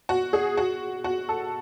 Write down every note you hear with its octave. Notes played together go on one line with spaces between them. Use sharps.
F#4
G#4
F#4
F#4
A4